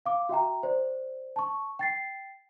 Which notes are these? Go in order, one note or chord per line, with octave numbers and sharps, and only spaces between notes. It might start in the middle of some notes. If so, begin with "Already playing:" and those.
F5 D6
F#4 E5 G5 A#5
C5 D5
A5 C#6
G5 A6 C7